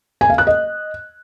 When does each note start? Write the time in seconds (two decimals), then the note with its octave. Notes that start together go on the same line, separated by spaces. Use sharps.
0.21 G#5
0.30 F5
0.38 F#6
0.47 D#5